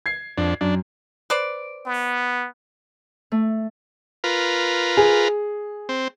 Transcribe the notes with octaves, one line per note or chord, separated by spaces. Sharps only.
G#6 C7
F2 D4
F#2 D4
B4 C5 D5
B3
A3
F4 A#4 B4
G#4
C4